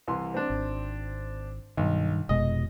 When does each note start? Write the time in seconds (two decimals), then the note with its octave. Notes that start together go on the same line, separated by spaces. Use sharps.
0.08 C2 E3 C6
0.34 C4 D4
0.50 G#1
1.77 B1 G2 D#3
2.29 F1 B2 G#3 D#5